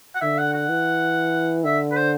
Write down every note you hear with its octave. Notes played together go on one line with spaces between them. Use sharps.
F#5
D3 E5
F#5
F#5
E3
D3 E5
B4
C5